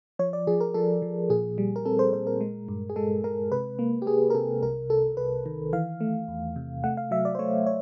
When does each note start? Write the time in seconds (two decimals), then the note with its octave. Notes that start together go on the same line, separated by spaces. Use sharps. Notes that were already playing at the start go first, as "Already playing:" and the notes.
0.19 F3 C#5
0.33 D5
0.47 F3 G#4
0.61 A#4
0.74 F3 A4
1.02 F3
1.30 A#2 G#4
1.58 G3
1.76 A#4
1.85 C4 A4
1.99 C5
2.13 A#2 C5
2.27 A#4
2.41 G#3
2.68 G2
2.90 G#4
2.96 G#3 A4
3.24 G#3 A#4
3.52 C3 B4
3.79 A#3
4.02 G4
4.06 A#3 G#4
4.30 A#4
4.35 C3 A4
4.62 C2 A#4
4.90 C2 A4
5.17 C2 B4
5.46 D#3
5.73 E3 F5
6.01 A3
6.28 E2
6.56 C3
6.84 A3 F#5
6.97 F5
7.11 F#3 E5
7.25 D5
7.35 C5
7.39 A3 C#5
7.67 C#5